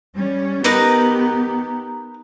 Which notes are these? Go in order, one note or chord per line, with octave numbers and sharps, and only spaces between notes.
G3 C#4
B3 D#4 G4 A#4 B4